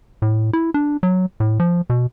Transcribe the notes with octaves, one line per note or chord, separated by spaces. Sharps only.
A2
E4
D4
F#3
A2
F3
B2